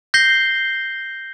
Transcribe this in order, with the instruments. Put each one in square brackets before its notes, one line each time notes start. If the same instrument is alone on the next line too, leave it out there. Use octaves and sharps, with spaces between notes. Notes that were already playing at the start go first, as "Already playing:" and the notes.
[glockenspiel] G6 A#6 C7 G7